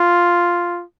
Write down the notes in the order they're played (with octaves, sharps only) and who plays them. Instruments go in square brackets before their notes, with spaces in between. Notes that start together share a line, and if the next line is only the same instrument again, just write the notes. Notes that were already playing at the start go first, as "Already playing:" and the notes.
Already playing: [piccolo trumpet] F4